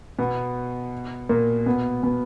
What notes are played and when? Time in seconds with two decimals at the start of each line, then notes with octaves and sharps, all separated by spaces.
0.19 B2 B3
1.29 A#2 A#3
1.66 B2 B3
2.03 B2 B3